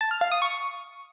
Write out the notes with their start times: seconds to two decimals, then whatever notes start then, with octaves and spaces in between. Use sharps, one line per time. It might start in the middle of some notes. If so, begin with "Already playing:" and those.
0.01 A5
0.11 F6
0.21 F5
0.32 D#6
0.42 C#6